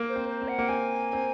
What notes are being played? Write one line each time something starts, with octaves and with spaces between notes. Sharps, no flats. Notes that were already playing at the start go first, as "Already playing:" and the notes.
Already playing: A#3
C5
C4
C5
C4
F#5
A#3
C4 G#5
C4